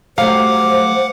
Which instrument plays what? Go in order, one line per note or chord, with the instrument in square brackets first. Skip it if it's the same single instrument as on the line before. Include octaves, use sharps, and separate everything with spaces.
[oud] F#3 G3 A3 [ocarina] C5 [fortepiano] F5 [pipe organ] F#5 D6